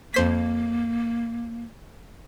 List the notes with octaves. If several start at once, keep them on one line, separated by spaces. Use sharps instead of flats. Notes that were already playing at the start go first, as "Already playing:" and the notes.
F2 A#3 C5 B6